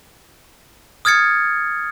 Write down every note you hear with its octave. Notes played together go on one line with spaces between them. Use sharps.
D#6 F6 G#6 A6 C#7